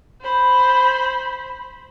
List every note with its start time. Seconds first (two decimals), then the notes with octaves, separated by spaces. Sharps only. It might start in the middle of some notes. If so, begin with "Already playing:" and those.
0.21 C5 B5